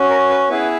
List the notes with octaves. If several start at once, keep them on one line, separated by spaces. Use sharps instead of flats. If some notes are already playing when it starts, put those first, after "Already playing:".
Already playing: C#4 F#4
A#4
B4
B3 E4 G#4 B4